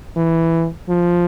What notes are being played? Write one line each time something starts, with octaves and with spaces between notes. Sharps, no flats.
E3
F3